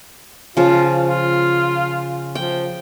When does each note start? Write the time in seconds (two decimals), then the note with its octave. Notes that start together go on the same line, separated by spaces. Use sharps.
0.57 C#3 F3 F4
1.02 F4
2.35 F3 G5